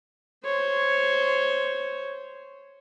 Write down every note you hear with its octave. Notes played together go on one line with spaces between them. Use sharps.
C5 C#5